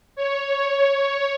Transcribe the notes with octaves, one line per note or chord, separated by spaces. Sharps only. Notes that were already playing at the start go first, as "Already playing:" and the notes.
C#5